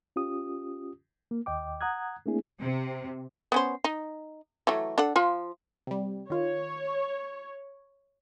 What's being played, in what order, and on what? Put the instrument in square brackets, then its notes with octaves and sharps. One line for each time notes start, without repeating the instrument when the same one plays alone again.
[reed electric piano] C#4 F4 G4 D#6
A#3
D#2 D#5 G5 D6
F#5 A#5 D#6 F#6 G#6
A3 A#3 C4 D4 E4 G#4
[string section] C3
[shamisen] B3 C#4 C5
D#4
E3 F#3 A3
D4 A4 F#5
F3 F4
[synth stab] C3 G3
[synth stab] D#3 F4 [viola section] C#5